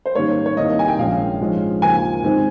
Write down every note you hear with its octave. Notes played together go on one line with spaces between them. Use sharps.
C5
G#2 D#3 G3 A#3 C#4 C#5
C#5
C2 C3 D#3 A#3 D#5
G#5
G5
A#1 A#2 G#3 C#4 F5
G#2 F3 G#3 C#4
D#2 C#3 F3 A#3 G#5
G#2 D#3 G#3 C4 D#4